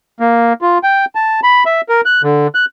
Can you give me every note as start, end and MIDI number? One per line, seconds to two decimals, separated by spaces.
0.20 0.53 58
0.62 0.78 65
0.83 1.05 79
1.15 1.40 81
1.43 1.64 83
1.66 1.81 76
1.89 2.01 70
2.06 2.22 90
2.23 2.47 50
2.55 2.65 90